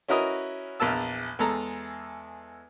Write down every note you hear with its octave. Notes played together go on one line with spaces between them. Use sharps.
C#4 E4 F#4 A#4 B4 D#5
A#1 E2 A#4 A5 E6
E2 G#3 A4 A#5